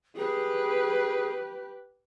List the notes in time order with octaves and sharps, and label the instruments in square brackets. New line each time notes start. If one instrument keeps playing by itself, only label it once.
[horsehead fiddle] G4 B4 [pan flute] G#4